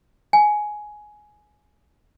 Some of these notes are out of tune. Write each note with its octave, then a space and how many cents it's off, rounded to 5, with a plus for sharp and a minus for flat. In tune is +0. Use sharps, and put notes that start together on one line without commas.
G#5 +15